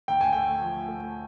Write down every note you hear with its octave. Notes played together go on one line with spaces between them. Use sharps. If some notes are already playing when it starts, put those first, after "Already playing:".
D2 G5
G#5
A3 G5
F3
A3